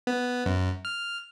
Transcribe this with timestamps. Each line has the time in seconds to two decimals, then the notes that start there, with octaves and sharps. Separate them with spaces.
0.07 B3
0.46 F#2
0.85 F6